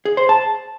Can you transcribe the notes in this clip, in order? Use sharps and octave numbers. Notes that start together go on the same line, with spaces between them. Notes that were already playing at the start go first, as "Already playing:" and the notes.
G#4
C5
A5